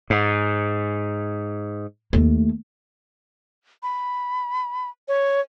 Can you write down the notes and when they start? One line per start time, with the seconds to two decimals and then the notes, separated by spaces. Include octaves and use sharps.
0.10 G#2
2.13 D#2 A3
3.83 B5
5.08 C#5